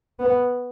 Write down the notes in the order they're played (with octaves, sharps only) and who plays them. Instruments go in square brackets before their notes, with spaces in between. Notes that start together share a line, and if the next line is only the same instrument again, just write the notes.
[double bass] B3